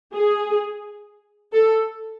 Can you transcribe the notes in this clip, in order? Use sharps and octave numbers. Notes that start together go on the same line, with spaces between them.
G#4
A4